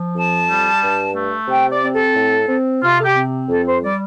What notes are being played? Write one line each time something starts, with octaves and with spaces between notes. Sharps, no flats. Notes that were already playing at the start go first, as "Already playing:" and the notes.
Already playing: F3
F2 A5
G3
G2
A3
C3 G5
D5
C4
A4
A2
C4
C3 F4
A4
G4
C4
F2 A4
C5
G3 D5